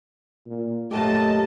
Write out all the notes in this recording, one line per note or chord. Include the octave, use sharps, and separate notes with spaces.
A#2
F#2 A#2 A3 G4 D#5 A5